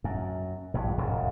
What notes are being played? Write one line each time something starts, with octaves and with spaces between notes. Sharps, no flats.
F#2
A#1 G2
E1 G#2 C#3